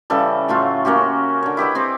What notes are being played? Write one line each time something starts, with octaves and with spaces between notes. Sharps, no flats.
C#3 E3 G3 A4
A2 F#3 A3 F4
A#3 C#4 F#4 G4
D3 C#5
E4 G4 B4 D#5
C4 G4 G#4